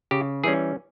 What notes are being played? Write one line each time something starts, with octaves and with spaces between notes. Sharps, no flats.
C#3 G4
E3 G3 C#4 G#4